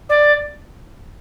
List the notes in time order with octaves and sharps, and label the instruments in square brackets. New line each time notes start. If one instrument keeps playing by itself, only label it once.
[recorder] D5